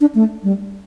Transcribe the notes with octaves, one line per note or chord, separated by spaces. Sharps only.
D4
A3
G3